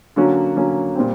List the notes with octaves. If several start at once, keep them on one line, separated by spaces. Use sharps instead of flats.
D3 F#3 A#3 C#4 F#4
D3 F#3 A#3 C#4 F#4
A#2 G3 C4